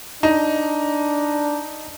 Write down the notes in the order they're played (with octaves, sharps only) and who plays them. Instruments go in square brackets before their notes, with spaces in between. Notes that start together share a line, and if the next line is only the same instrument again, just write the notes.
[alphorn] D4 [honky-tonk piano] D#4